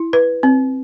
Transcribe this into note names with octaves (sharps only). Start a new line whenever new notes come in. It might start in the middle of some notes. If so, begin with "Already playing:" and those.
Already playing: E4
B4
C4